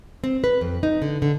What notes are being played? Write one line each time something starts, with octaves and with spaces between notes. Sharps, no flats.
C4
B4
F2
D#4
D3
D3